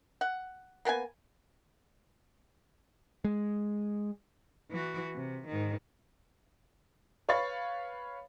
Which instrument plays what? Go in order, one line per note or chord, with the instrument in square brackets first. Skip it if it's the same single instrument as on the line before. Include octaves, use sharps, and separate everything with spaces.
[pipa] F#5
A#3 B3 A4 G#5
[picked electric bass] G#3
[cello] E3 F#4
C3
G#2 D#3
[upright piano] B4 C#5 F5 B5 C#6 A6